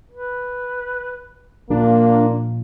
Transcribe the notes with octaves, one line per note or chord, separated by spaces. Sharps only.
B4
A#2 F3 A#3 D4 F4